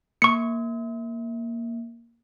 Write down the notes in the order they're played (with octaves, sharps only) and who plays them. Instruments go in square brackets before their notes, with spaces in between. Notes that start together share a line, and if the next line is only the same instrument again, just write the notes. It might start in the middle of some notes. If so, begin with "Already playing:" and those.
[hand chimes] A#3 [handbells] C#6 C#7